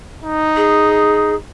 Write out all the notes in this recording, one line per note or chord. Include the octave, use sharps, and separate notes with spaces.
D#4
G#4